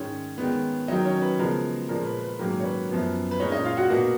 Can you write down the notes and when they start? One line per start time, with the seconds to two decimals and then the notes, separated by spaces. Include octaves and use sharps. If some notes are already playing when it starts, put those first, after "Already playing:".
Already playing: G#2 D#3 G#3 C#4 C#5
0.38 D#3 G#3 B3
0.88 D#3 F#3 C#4 D#4 D#5
1.05 C#4 C#5
1.22 B4
1.38 C#3 F3 G#3 B3 D#4 A#4
1.89 A#2 F3 G#3 A#4
2.06 B4
2.23 B4
2.39 G#2 D#3 F#3 A#3 C#4 A#4
2.60 C#5
2.64 B4
2.89 F#2 F3 B3
3.31 B4
3.40 A#2 G#3 C#4 D#4 C#5
3.52 D#4 D#5
3.64 F4 F5
3.77 F#4 F#5
3.90 B2 A#3 D#4 F#4 F#5